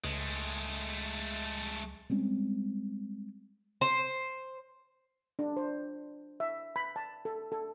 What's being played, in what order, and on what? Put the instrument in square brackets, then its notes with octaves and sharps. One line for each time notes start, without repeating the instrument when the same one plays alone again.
[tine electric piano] C#2 [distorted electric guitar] G#3 A3
[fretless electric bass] G3 G#3 C4 C#4
[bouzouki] C5
[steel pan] D4
C5
E5
B5
A5
A4
A4